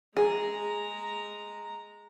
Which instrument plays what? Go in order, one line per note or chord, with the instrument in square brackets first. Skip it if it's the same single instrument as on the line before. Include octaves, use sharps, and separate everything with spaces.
[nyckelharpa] G#3 A#5 [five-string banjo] G#4